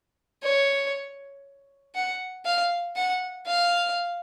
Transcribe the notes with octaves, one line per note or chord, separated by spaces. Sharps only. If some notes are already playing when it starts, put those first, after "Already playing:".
C#5
F#5
F5
F#5
F5